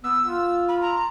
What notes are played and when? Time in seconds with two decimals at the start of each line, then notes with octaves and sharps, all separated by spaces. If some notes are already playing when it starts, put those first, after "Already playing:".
0.04 B3 E6
0.23 F4
0.69 B5
0.82 A#5